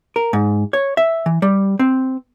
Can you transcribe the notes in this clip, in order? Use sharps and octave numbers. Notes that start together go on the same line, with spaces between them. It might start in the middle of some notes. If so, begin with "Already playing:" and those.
A#4
G#2
C#5
E5
E3
G3
C4